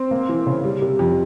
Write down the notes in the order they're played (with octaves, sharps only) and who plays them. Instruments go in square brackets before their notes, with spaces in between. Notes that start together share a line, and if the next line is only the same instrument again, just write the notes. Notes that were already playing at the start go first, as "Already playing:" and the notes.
Already playing: [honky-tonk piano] C4
[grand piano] A#3
E3
C#3
G3
C3
F2